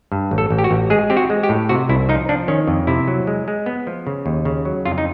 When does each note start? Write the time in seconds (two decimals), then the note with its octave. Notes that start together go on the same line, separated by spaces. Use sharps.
0.12 G2
0.31 A1
0.38 A4
0.50 A1
0.59 G4
0.64 F#4
0.71 A1
0.90 G#3 G#4
1.10 C4 G4
1.17 F#4
1.30 G#3
1.43 G4
1.49 A2
1.69 C3 F#4
1.89 C2 E4
2.09 F3 D#4
2.29 F3 D4
2.48 D#3 C#4
2.68 F2
2.87 C3 E4
3.08 F#3
3.27 G#3
3.48 G#3
3.66 B3
3.87 F3
4.07 C#3
4.26 D#2
4.45 C#3
4.65 F#3
4.85 F2 F4
4.98 D#4